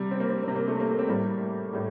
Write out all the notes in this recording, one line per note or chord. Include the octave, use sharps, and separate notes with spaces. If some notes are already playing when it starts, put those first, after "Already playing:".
Already playing: C3 G3
C4
A#3
C4
C3 G3 C4
A#3
A3
A#3
C4
A2 G3 A#3
A2 G3